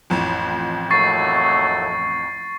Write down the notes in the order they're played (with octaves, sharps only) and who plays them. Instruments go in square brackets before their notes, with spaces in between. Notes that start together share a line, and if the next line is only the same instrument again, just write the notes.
[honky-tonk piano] A1 F2
[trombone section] D#2 F#3 A3 [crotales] C#6 A6 C7